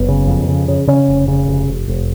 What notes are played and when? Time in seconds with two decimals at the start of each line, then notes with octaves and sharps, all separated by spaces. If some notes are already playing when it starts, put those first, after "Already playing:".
Already playing: F#1 B3
0.09 C#3
0.27 F2
0.48 C#3
0.68 C#3
0.87 C#3 C#4
1.08 F1
1.28 C#3
1.48 F1
1.68 F1
1.88 F1